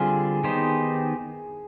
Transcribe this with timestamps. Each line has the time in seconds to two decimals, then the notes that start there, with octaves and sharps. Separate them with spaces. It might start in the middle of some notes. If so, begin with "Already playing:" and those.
Already playing: D3 G3 C4 F4 G#4
0.44 D#3 B3 D#4 G4 C5